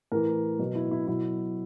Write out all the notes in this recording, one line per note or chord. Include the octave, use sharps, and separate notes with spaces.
A2 E3 A#4
B2 F#3
E4
E4
B2 F#3 E4